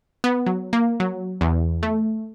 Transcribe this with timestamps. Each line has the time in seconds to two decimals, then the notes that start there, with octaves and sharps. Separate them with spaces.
0.24 B3
0.46 F#3
0.73 A#3
1.00 F#3
1.41 E2
1.83 A3